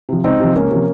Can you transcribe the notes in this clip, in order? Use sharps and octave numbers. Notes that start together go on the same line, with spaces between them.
C3 F3
C#2 C4 D#4
C3 F3
C#2 A#3 C#4
C3 F3